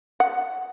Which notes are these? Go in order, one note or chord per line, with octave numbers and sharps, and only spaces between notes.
F#5